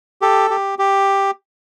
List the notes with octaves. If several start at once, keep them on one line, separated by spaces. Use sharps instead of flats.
G4 A4
G4
G4